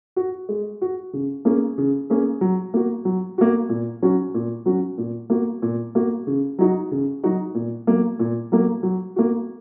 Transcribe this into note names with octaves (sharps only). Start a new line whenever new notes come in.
F#4
G#3
F#4
C#3
A#3 C#4 G#4
C#3
A#3 C#4 G#4
F#3
A#3 F#4
F#3
A#3 F#4
A#2
F#3 C#4 F#4
A#2
F#3 C#4 F#4
A#2
A#3 F#4
A#2
A#3 F#4
C#3
F#3 D#4 F#4
C#3
F#3 D#4 F#4
A#2
F#3 A#3
A#2
F#3 A#3
F#3
A#3 F#4